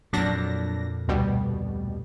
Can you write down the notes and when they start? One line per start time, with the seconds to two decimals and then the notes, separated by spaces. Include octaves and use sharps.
0.13 F2 A#2 F#3 D4 A#6
1.08 D2 B2 G3